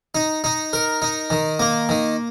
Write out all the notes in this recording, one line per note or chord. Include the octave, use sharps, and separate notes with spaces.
D#4
D#4
A#4
D#4
D#3
A#3
D#3